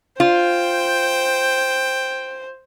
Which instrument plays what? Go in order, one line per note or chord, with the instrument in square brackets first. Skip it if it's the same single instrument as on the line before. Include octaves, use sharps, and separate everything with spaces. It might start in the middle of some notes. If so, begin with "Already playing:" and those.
[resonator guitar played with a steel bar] F4 [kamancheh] C5 [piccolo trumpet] G5